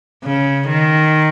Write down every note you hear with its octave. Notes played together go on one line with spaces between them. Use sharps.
C#3
D#3